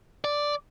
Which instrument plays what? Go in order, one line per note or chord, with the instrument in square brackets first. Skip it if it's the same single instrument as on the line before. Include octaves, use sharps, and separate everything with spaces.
[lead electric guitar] D5